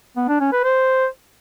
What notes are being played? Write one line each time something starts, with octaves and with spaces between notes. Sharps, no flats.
B3
D4
C#4
B4
C5